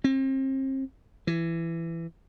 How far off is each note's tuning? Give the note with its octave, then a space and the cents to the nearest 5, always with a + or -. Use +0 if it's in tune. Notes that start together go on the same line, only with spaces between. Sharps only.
C4 +35
E3 +15